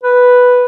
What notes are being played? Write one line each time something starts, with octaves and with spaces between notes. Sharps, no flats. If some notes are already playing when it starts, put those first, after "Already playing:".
B4